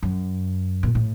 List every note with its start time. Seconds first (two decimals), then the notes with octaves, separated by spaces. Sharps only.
0.03 F#2
0.83 A#2
0.95 A2